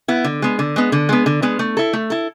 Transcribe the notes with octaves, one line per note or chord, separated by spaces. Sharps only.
B3 E4
D3
G#3 B3
D3
G#3 B3
D3
G#3 B3
D3
G#3 B3
A3
E4 A4
A3
E4 A4